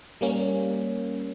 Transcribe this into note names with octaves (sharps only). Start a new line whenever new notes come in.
G3 A#3 C#4